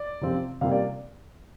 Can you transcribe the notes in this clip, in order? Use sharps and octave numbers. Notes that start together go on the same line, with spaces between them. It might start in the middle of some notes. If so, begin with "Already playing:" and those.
Already playing: D5
C3 F3 C4 F4
C3 G3 A#3 F4 F5
D5